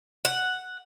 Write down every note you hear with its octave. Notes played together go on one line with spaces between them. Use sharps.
F#5